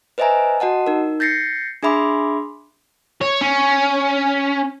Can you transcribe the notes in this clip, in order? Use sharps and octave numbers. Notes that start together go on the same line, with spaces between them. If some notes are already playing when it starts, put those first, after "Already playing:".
B4 C5 D#5 E5 G#5 A#5
F#4 D#5 F#5 A5
D#4 A#4
G6 A6 A#6 C7 C#7
D4 G#4 E5 B5 C6 D6
C#5
C#4